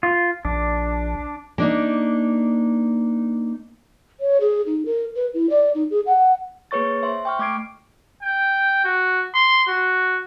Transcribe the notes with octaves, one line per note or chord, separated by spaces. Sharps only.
F4
A#1 D4
A#3 D4 D#4
C#5
G#4
D#4
A#4
B4
E4
D5
D#4
G#4
F#5
A#3 G#4 B4 C#5 C#6 A6
C5 E5 C6
G5 C#6 F6
A3 D6 F6 G#6 C7 D7
G5
F#4
C6
F#4